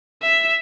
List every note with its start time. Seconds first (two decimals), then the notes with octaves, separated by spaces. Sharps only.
0.22 E5